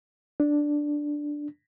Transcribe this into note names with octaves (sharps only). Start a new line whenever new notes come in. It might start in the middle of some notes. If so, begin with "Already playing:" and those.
D4